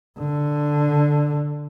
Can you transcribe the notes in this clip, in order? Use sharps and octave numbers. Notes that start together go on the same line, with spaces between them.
D3